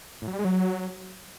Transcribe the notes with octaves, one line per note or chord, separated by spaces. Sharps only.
A2
F#3
G3
G#3
F#3